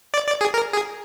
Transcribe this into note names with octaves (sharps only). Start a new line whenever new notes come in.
D5
D5
G#4
A#4
G#4